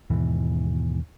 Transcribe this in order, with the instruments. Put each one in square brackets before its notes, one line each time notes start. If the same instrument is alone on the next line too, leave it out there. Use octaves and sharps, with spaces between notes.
[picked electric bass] D#2 G#2 B2 E3